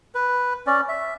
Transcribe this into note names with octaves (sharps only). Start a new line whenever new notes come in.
B4
C#4 D5
E5